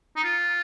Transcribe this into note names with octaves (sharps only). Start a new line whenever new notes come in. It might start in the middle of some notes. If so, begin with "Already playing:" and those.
D#4
F4